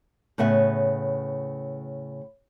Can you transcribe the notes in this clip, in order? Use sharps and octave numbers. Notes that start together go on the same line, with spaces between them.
A2 C#3 B3 E5